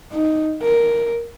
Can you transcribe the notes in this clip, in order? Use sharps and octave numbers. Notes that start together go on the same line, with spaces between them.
D#4
A#4